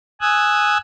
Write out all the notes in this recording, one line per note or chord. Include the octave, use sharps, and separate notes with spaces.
G#5 D#6 E6 F#6 G#6